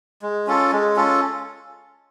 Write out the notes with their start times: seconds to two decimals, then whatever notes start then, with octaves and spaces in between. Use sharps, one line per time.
0.22 G#3
0.47 C#4 F4 A4
0.72 G#3
0.96 C#4 F4 A4